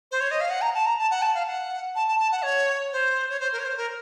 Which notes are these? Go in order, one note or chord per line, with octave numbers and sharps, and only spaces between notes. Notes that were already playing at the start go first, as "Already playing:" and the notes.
C5
C#5
D#5
F5
F#5
A#5
A5
A#5
A5
F#5
A5
F5
F#5
A5
A5
A5
F#5
C#5
C5
C#5
C5
A#4
C#5
C5
A#4